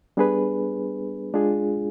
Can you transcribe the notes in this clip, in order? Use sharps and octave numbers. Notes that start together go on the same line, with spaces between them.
G3 B3 D4 G#4 B4
G#3 D4 F4 G#4